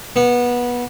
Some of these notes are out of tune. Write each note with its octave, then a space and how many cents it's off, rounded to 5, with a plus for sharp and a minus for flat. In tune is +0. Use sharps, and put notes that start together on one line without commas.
B3 -20